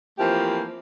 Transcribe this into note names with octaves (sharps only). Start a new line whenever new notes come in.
E3 F3 A3 A#3 C4 G4